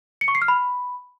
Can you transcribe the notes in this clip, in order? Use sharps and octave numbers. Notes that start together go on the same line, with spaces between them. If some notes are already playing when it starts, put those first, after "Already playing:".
C#7
C#6
C7
F6
B5